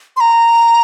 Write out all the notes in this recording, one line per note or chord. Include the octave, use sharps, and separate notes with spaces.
C6
A#5